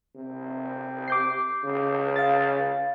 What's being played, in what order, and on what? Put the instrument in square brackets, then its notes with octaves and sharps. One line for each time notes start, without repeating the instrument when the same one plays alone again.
[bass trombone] C3
[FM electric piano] D6 G6 C7
[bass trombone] C#3
[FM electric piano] F5 A6